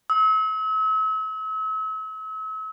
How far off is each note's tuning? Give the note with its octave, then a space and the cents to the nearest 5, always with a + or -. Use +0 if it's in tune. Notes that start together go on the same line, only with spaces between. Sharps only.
E6 -40